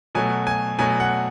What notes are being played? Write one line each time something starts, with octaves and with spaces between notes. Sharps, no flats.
B2 F#3 A3 G#5
G#5
B2 F#3 A3 G#5
F#5